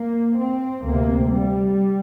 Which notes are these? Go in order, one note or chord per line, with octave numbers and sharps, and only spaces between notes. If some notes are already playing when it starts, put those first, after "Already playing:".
Already playing: A#3
C4
D2 C3 A#3
G3